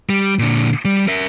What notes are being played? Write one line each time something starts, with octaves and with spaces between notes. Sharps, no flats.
G3
A#2 D3
G3
A#4 E5